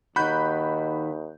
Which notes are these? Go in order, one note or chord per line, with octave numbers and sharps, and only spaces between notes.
D#2 D#3 D#4 F#4 B5 F#6 G6